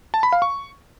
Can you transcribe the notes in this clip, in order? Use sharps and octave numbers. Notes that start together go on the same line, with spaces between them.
A5
B5
F5
C#6